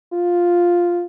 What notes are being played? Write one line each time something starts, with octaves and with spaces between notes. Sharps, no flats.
F4